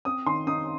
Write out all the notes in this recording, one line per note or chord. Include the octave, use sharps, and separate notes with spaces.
C4 D#6
D#3 C6
D#4 D#6